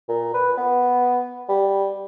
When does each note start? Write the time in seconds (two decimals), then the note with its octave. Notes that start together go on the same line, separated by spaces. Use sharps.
0.08 A#2
0.33 B4
0.58 B3
1.49 G3